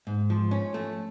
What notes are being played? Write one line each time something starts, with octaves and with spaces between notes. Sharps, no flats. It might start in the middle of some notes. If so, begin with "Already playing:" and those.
G#2
F3
C#4
A3